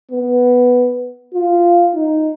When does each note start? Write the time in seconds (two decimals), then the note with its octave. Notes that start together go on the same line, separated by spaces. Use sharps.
0.11 B3
1.34 F4
1.94 D#4